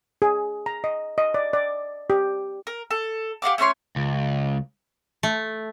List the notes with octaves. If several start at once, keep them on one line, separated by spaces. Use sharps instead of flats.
G#4
A#5
D#5
D#5
D5
D5
G4
A#4
A4
G4 F5 F#5 D6
A3 C#4 C#5 C6
C#2
A3